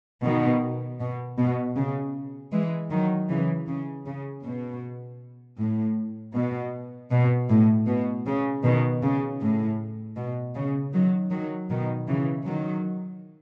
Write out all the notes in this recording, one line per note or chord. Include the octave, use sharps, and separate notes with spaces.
B2 D#3
B2
B2
C#3
E3 G#3
D#3 F#3
C#3 E3
C#3
C#3
B2
A2
B2
B2
A2
B2
C#3
B2 D#3
C#3
A2
B2
C#3
D#3 F#3
D#3 F#3
B2 D#3
C#3 E3
D#3 F#3